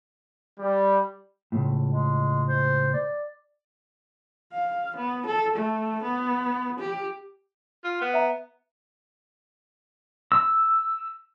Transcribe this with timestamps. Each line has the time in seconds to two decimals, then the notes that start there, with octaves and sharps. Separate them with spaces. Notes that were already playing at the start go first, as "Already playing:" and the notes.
0.59 G3
1.52 C#2 A2
1.90 G#3
2.49 C5
2.93 D5
4.53 F5
4.97 B3
5.26 A4
5.56 A3
6.03 B3
6.80 G4
7.84 F4
8.01 B3
8.14 E5 A#5
10.32 E6